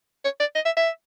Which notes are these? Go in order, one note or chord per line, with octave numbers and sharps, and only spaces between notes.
C#5
D5
D#5
E5
E5